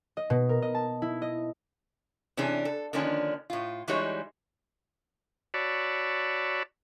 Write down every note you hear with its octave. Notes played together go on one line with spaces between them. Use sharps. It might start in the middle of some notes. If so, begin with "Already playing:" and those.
D#5
B2
A#4
D#5
A5
E4
D#5
C3 E3 C#4 D4 G#4
A4
D3 D#3 F3 A#3 C#4 D4
A2 F4
E3 G3 G#3 D#4 F#4 C#5
F#4 C#5 D5 A5 B5 E6